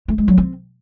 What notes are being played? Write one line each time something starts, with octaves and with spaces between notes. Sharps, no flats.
A3
G#3
F#3
C4